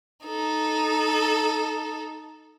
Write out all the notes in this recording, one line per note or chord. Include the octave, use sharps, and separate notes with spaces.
D#4 A4